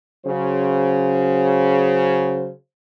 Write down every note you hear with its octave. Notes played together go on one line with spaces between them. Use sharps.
C#3 F#3 C5